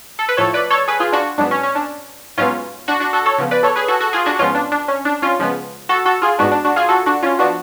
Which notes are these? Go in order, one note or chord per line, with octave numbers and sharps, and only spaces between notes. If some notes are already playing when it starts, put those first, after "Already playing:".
A4
B4
A2 F3 A3 A4 C#5
B4 D5
A4 C#5
G#4 B4
F4 G#4
D4 F#4
G#2 F#3 B3 D4
C#4
C#4
D4
G#2 F#3 B3 C#4 F4
D4 F#4
D4 F#4
F#4 A4
A4 C#5
C#3 F3 B3
B4 D5
A4 C#5
G#4 B4
F#4 A4
F#4 A4
F4 G#4
D4 F#4
G#2 F3 B3 C#4 F4
D4
D4
C#4
D4
C#4 F4
C#3 F3 G#3 B3
F#4 A4
F#4 A4
F4 G#4
G#2 G#3 B3 D4 F#4
D4
D4 F#4
F4 G#4
F#4 A4
D4 F#4
C#4 F4
F3 B3 D4 F#4